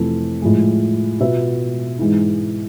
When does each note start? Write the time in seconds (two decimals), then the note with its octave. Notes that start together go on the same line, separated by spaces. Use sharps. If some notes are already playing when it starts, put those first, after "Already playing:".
Already playing: F2 C3 E3 A3
0.42 A2 F3 G#3
1.20 B2 B3 F4 B4 E5
1.99 G#2 E3 G#3